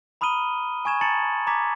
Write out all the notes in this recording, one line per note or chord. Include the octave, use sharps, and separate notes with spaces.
A#5 B5 D#6 F6 D#7 G7
G#5 C#6 G#6 E7
A5 A#5 A6 C#7 F#7
A#5 D6 G#6 B6